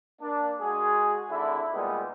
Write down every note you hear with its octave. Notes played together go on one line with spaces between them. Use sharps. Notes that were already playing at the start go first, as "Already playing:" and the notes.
A#3 D4
G#3 F#4 G#4
G#1 D3 E4
A#2 G3 G#3 B3 D#4